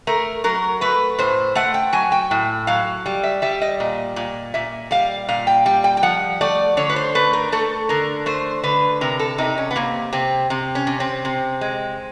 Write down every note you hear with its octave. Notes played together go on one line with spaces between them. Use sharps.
A3 A#4
F#3 A#4
A3 B4
A2 C5
A3 F#5
G5
F#3 G#5
G5
A2
F#3 F5
G3
E5
G3 E5
D#5
A#2
A#2
A#2 E5
G3 F5
A#2 F5
G5
G3 G5
G5
G5
F3 F#5
A3 D5
D3 C#5
B4
C5
A3 B4
A#4
A3 A4
D3 A#4
A3 C5
D3 B4
C3 A#4
A4
C3 D#4
C#4
B3
C3 A#3
C3 C4
C3
C#4
C3
C4
C3
G#3